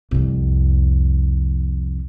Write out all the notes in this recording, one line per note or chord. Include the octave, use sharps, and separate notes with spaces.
C2 F2